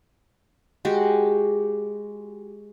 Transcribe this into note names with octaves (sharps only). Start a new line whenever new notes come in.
G#3 F#4 G4